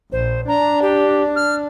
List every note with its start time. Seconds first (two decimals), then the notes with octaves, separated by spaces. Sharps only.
0.12 A#1 C5
0.48 D4 A#5
0.82 G4
1.36 F6